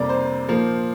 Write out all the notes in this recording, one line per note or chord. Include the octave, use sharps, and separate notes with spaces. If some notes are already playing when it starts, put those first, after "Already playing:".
Already playing: F2 C3 G3 A#3 D5 A#5
C5
A#2 F3 A#3